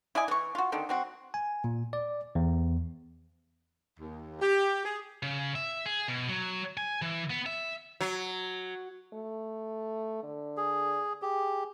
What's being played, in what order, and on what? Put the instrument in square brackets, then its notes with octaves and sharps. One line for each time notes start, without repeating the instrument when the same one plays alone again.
[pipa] E4 D5 D#5 G#5
E3 C#6
F4 F#4
D3 D#3 C4
F#3 C4 F#4
[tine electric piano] G#5
A#2
D5
E2
[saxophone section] D#2
G4
G#4
[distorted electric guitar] C#3
E5
G#4
B2
F#3
G#5
E3
B3
E5
[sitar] F#3
[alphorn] A3
D3
[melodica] G#4
[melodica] G4 [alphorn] G#4